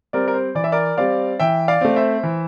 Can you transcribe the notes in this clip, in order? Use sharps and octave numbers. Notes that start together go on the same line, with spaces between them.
G3 C4 A#4 D5
A#4
C5
E3 D5
E5
A#4 D5
G3 C4 D5 F5
E3 E5 G5
D5 F5
A3 C4
C5 E5
E3